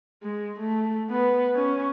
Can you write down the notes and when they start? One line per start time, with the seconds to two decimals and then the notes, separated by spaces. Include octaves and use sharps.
0.23 G#3
0.60 A3
1.10 B3
1.56 C#4